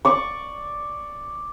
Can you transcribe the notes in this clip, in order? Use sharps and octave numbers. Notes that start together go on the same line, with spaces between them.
D5 C#6